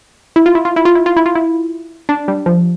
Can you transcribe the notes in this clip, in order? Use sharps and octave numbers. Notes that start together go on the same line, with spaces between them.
E4
F4
E4
F4
E4
F4
E4
F4
E4
F4
E4
D4
G3
F3